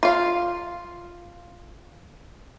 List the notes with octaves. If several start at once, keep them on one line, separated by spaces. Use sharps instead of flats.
F4 F5